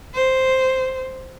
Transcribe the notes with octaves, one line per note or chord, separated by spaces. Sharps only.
C5